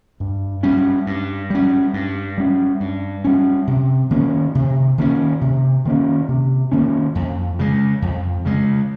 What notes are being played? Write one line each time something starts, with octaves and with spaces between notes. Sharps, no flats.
G2
G3 C#4
G2
G3 C#4
G2
G3 C#4
G2
G3 C#4
C3
D#3 A#3 C#4
C3
D#3 A#3 C#4
C3
D#3 A#3 C#4
C3
D#3 A#3 C#4
F2
C#3 G#3
F2
C#3 G#3